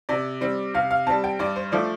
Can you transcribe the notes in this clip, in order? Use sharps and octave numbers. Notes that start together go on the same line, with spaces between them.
C3 D5
G3 C4
C3 F5
F5
G3 C4 A5
G5
G2 D5
C5
F3 A3 D4 D5